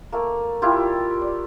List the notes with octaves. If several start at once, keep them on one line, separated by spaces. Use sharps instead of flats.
A3 A#3
G3 E4 F4 G4
D5